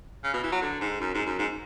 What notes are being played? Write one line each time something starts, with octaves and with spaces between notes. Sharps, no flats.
C#3
B2
E3
F#3
D3
G#2
F#2
G#2
F#2
G#2